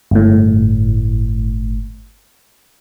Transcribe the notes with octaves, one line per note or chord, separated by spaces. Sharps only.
G1 A2